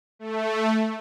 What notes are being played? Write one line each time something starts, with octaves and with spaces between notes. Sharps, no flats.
A3